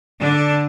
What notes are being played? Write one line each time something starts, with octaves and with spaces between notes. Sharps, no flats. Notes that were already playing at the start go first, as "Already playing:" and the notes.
D3 D4